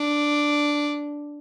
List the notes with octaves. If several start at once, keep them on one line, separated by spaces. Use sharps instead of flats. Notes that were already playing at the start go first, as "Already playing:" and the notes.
Already playing: D4